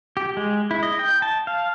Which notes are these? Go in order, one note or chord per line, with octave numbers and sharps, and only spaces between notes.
G4
G#3
E4
D#5
G5
A5
F5